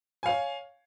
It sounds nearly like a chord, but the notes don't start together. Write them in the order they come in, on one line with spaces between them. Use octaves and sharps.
G#5 F5 C#5